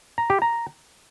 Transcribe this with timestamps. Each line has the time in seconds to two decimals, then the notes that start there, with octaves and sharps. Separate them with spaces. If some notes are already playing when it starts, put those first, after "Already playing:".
0.18 A#5
0.30 G4
0.42 A#5